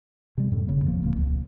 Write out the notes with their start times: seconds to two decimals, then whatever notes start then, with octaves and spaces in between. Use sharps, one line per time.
0.38 C3 G3
0.51 F#2 A2
0.67 F#1 C#3 A#3
0.85 E2 F3 A#3
1.03 D1 A#2 F3 A#3
1.16 C#2